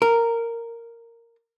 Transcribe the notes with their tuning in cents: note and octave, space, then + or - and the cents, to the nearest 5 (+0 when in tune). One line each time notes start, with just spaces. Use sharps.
A#4 -10